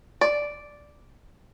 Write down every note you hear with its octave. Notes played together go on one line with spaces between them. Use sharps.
D5